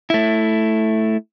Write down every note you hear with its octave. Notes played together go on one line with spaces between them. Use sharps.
A3 E4